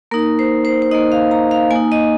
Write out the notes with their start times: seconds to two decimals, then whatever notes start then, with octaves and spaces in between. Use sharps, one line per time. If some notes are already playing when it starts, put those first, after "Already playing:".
0.11 A#3 D#4 A#4
0.39 C5
0.65 C5
0.82 C5
0.92 A#3 D#4 D#5
1.12 F5
1.31 A#5
1.51 F5
1.71 A#3 G#5
1.76 D#4
1.92 D#5